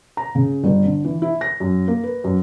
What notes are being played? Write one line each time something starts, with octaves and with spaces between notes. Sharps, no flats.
A#5
C#3
G1
D3
E3
E4
A#6
F#2
A#3
B4
F#2